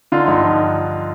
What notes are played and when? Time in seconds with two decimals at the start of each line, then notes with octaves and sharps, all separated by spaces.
0.12 D3 D#4 F4
0.28 G2 D#4
0.43 F3 D#4